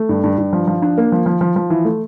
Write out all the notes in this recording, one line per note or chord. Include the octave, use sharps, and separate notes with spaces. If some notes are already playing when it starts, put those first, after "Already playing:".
Already playing: A3
G2
G2
G2
F3
F3
D4
A#3
F3
F3
F3
F3
E3
A3